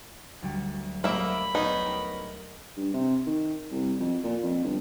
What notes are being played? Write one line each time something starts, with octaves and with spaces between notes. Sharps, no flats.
D2 F#3 G3
G#2 C#3 F#3 A#3 G4 D5 E5 B5
B3 C#4 D#4 G#4
G4 A#4
G2
C3
D#3
C2
F2
A#2
F2
G1